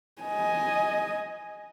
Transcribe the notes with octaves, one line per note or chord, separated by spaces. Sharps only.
D#5 G#5